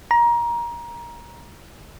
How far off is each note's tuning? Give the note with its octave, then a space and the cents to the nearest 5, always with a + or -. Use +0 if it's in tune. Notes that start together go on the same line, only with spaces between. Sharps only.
A#5 +20